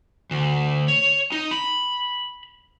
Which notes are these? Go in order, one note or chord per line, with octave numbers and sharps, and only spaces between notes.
D2
C#5
D#4
B5